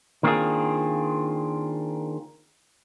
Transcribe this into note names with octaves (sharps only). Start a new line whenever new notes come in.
D#3 A#3 C4 D4 F4 G#4